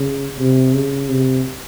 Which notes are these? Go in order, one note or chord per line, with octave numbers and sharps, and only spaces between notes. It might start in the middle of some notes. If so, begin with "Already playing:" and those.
Already playing: C#3
C3
C#3
C3